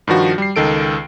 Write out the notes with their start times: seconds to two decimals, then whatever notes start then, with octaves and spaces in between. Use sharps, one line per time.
0.07 G2 D#3 F3 F#4
0.38 G3 C7
0.56 C#2 D#3 A4 D7